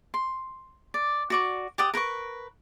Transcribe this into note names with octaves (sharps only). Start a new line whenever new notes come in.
C6
D5
F#4 D5 C#6
G4 D5 F#5 D#6
A#4 B4 C6 C#6